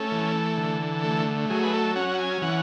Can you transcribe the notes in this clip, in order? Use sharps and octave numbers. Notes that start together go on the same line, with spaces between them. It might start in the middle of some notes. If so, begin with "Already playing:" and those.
Already playing: A3 C#4 A4
E3
D3
A3
F#3 G#4
B4
A4
C#4 F#5
G#5
E3 F#5